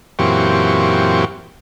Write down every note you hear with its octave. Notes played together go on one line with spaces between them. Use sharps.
F#2 A#2 E3 C4 G4 C#6